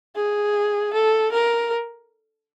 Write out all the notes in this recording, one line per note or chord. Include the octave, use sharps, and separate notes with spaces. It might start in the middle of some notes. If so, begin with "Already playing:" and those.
G#4
A4
A#4